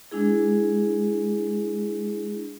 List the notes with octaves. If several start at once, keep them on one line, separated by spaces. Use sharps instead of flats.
G#3 D4 E4 G#4